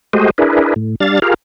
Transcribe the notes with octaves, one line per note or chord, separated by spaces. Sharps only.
G#3 A3 F#4 G4 C5 D#5
D4 E4 G#4 A#4 B4
A2
G3 D4 F5 A6
F4 G4 G#4 A#4 F5